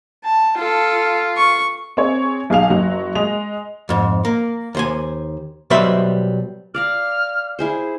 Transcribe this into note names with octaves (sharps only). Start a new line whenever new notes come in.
A5
F4 A4
C#6
C4 G#4 C#5
B1 G#4 F5 F7
F#1 F#3 F#4
G#3 D#5 F7
F2 G#2
A#3
D#2 C5 G#5
B2 F#3 G3 B4 C5 E5
D5 F5 A#5 F6
E4 G#4 C5